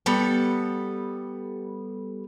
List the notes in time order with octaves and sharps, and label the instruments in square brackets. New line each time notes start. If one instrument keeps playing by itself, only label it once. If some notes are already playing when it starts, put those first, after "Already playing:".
[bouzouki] G3 B3 A4